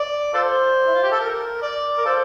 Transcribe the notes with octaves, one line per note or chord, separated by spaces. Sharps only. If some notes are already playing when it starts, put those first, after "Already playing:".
Already playing: D5
F4 A4 C5
E4
F4
G4
A4
A#4
D5
A#4
F4 A4 C5